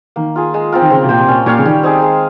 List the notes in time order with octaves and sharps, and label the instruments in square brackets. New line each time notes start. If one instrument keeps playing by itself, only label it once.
[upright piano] D#3 [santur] A#3
[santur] F4 G#4
G#3
C4 F4 A#4
[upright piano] D#3
[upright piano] C#3 [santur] C4
[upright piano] C3
[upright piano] A#2 [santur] G4 C5
[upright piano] C3
[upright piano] A#2 [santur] C#4
[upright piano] A#2 [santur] G4 C#5 F5
[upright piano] C#3
[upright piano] D#3 [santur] G3
[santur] C4 D#4 G#4
G#3